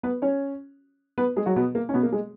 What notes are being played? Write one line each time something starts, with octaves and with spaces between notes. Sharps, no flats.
B3 B4
C#4 C#5
B3 B4
G#3 G#4
F#3 F#4
B2 B3
A#3
C#4
B2 B3
A#3
G#3